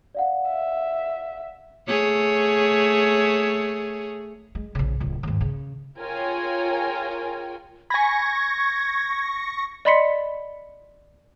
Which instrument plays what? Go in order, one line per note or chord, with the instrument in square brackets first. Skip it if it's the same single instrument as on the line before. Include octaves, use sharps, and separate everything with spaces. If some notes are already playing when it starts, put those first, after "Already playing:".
[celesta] D5 F5 F#5
[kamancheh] E5
[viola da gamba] A3 G#4 C#5
[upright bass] G#3
A#1 C#3
D1 C#2
D#2 G#2
C#3
[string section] F4 G#4 A#4 C#5 G5 G#5
[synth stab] G#5 B5 [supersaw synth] C#6 A#6 [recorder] G#6
[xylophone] D5 D#5 B5 C6 B6 C#7